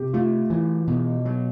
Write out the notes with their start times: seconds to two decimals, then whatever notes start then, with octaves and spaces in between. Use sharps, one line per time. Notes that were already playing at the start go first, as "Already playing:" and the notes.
Already playing: C3 G4
0.13 A3 F4
0.50 E3 E4
0.87 B2
1.25 F#3